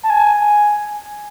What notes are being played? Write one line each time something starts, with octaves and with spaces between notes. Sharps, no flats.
A5
G#5